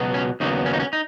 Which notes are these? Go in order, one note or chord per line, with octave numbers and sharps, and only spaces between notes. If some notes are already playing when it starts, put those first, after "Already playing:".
Already playing: C#2 B2 F#3 B3
C#4
D#2 C#3 F#3 B3 D#4
C#4
D#4
C#4
D#4